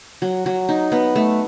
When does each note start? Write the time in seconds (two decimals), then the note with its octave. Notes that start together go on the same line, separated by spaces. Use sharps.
0.22 F#3
0.46 F#3
0.69 D#4
0.92 B3
1.15 A3